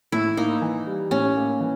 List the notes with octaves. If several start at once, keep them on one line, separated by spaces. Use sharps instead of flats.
A2 E4
A#3 D#4
E3
G3
A2 C#4
A#3
E3